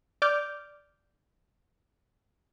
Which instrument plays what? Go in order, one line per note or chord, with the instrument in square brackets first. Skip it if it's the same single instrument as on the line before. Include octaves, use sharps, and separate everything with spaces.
[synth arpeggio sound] D5 D6 F6 G6